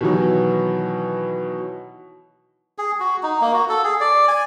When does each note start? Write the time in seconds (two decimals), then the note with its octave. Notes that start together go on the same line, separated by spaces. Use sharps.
0.01 B2 D#3 E3 F#3
2.78 G#4
3.00 F#4
3.23 D#4
3.41 A#3
3.54 F#4
3.69 A4
3.84 G#4
4.00 D5
4.28 G#5